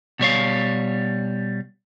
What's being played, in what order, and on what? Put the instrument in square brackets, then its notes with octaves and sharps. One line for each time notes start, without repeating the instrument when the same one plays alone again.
[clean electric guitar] B2 G3 C#5 F5